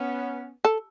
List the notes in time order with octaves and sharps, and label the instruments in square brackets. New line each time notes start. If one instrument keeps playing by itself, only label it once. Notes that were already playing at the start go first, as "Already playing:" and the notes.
Already playing: [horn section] B3 C#4
[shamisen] A4